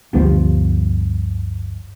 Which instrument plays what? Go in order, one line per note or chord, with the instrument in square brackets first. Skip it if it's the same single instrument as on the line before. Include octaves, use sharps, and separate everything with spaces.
[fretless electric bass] G1 D2 G2 F3